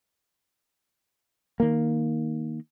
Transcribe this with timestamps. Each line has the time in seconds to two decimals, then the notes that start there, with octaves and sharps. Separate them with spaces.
1.60 D#3 A#3